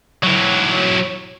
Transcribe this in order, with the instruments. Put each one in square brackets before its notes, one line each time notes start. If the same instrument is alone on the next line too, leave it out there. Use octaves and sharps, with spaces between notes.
[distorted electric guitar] F#3 E4